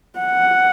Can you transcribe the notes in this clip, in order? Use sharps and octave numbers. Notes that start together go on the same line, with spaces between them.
F#5